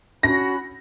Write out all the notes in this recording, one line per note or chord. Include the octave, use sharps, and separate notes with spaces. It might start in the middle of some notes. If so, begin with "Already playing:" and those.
C#4 F#4 B5 A#6